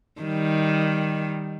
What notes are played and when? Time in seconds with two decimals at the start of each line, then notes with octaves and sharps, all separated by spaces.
0.22 D#3 G3